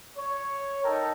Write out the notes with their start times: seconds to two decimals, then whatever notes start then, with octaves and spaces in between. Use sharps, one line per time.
0.16 C#5
0.84 D#4 A4 A#4 G5